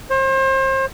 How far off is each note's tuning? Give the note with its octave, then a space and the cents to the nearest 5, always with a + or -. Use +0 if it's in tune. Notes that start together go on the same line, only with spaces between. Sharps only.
C5 +35